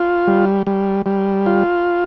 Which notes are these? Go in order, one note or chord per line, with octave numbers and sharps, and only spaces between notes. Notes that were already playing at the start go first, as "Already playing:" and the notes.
Already playing: F4
G3
G3
G3
F4